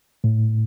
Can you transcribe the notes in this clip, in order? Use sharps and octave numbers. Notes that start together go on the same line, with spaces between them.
A2